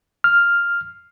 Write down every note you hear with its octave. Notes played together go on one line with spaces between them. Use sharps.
F6